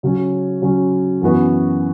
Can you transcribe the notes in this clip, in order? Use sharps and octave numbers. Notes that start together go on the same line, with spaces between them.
C#3 F#3 C#4
C#3 F#3 C#4
F#2 E3 B3 F#4 B4